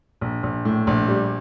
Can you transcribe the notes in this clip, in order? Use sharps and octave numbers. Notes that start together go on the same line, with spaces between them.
A#1
A#1
A2
A#1
G3